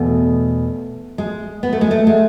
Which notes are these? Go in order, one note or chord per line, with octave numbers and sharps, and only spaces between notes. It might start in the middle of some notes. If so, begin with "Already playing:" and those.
Already playing: E2 B2 A3
G#3
B3
A3
G#3
A3
G#3